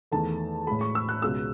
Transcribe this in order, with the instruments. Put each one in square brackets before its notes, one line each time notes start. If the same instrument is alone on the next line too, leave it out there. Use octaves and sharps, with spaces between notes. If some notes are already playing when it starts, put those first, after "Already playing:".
[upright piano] E2 D#3 A3 A5
A2 G#3 B5
C#6
E6
F#6
C#2 B2 G#3 E6